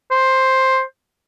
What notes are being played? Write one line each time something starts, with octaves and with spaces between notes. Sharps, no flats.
C5